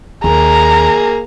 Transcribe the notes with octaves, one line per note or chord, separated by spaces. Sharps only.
D#2 A#3 G#4 A#5